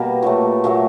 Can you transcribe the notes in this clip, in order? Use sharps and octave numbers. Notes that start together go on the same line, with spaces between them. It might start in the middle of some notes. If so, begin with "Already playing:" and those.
Already playing: B2 G3 A#3 B4
A#2 F#3 A3
A#2 F#3 A3